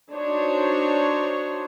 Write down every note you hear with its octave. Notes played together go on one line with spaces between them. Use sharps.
D4 D#4 F#4 C5 C#5